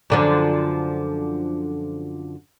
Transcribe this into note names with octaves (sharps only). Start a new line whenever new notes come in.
F#2 D3 F3